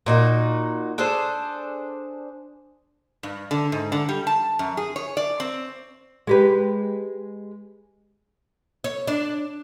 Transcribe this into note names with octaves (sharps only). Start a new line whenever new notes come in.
A#2 D#4 F#4
D4 G#4 A4 C5
G2
D3
G#2
D3
G3
A5
F#2
G#4
C#5
D5
C4
G#3 G4 B4
C#5
D4